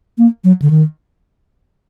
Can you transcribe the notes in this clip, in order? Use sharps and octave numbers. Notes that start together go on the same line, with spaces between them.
A#3
F#3
D3
D#3